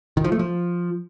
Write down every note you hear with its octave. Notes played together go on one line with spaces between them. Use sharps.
D#3
F3
A3
F3